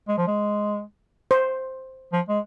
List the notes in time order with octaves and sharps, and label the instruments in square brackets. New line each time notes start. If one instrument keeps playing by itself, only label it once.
[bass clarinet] G#3
F3
G#3
[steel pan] C5
[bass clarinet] F3
G#3